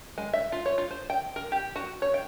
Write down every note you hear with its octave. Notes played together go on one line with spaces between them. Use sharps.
G#3
E5
F4
C#5
F4
C5
G5
A#4
G4
F#4
C#5
G5